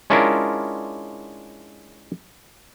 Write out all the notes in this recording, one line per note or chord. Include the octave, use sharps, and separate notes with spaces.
G#3 C#4 D4 E4 F4 A#4